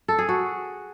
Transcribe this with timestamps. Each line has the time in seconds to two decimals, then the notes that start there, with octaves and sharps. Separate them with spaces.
0.08 A4
0.19 G#4
0.29 F#4